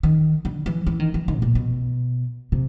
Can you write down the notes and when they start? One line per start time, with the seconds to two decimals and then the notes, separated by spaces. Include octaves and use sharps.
0.03 D#3
0.45 D3
0.66 E3
0.87 E3
1.00 D#3
1.14 E3
1.28 D#3
1.36 A2
1.42 A#2
1.55 B2
2.52 C3